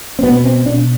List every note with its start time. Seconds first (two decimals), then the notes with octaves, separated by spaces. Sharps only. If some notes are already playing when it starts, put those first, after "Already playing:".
0.19 C4
0.23 B2 B3
0.44 C4
0.65 B2 D4